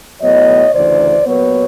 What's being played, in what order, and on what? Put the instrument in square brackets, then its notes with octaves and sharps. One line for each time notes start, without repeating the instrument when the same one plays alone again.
[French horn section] A2 F#3 B3 C#5 D#5
D2 C#3 E3 C5 D5
A#2 F#3 B3 B4 C#5